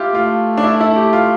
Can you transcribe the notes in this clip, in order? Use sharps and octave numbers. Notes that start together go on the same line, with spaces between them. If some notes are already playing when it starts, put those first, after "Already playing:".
Already playing: E4 F4 G4
A3 F4
D4
E4
E4
G4
F4